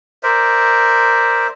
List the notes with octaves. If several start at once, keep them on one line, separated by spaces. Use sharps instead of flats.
A#4 C5 D5 E5